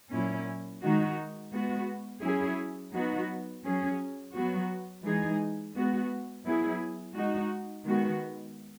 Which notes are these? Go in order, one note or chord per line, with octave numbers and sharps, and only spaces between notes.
A#2 F#3 C#4 E4
D#3 G#3 D#4 F#4
G#3 B3 F#4
F#3 C#4 E4 G#4
F#3 B3 D#4 F#4
F#3 C#4 G#4
F#3 B3 F#4
E3 G#3 D#4 G#4
G#3 B3 F#4
F#3 B3 E4 G#4
G#3 D#4 F#4
D#3 G#3 B3 F#4